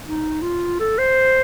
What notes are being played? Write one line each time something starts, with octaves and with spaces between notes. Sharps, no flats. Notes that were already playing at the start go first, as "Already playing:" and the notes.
D#4
F4
A4
C5